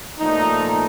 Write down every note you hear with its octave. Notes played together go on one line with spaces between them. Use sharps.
A#2 F3 A3 D#4